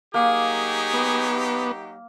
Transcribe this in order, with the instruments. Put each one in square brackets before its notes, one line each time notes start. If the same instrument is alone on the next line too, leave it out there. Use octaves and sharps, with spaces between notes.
[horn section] F#3 D#4 G4 [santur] A#3 [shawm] G#4
[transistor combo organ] B3